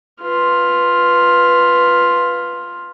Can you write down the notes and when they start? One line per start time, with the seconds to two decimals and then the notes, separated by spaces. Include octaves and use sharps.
0.21 F4 B4